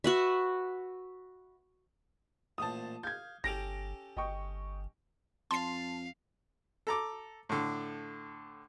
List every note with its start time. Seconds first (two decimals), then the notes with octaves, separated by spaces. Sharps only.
0.04 F#4 B4 E5
2.58 A1 A#2 C5 A5 D#6
3.03 F5 G6 G#6
3.44 G1 C#4 G4 A4 A#6 D7 F7
4.17 G1 D#5 G5 C#6
5.51 F2 F5 A5 C6 C7
6.87 A4 A#5 D6
7.49 A2 D3